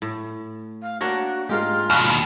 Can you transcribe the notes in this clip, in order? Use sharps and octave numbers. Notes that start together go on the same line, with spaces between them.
A2
F5
A#3 D4 F#4 C#5 A#6
G#2 G#3 F4 G4 A#4 F5
D#2 B2 C6 C#6 F#6